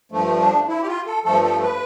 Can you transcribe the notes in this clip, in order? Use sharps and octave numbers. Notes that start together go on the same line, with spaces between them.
G2 F3 A3
D4
E4
G4
F4
A4
G2 F3 A3 A4
A4
B4